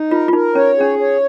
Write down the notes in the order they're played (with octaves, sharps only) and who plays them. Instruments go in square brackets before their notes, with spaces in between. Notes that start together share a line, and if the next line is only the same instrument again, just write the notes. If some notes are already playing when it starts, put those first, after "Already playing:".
Already playing: [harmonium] D#4
[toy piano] F4 [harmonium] A#4
[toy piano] F4
[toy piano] D#4 [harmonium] A#4
[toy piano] C#4 [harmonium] C#5
[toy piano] C#4 [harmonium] G#4
[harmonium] C#5